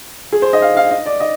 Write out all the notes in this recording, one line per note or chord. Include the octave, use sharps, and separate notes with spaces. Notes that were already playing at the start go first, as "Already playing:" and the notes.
G#4
C5
D#5
F5
F5
D#5
D5
D#5